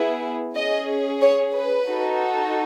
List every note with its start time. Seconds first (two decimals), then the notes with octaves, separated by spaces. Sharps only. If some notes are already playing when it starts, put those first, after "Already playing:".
Already playing: B3 E4 G#4
0.56 C#4 G#4 D#5
1.22 C#5
1.54 B4
1.88 D#4 F#4 A4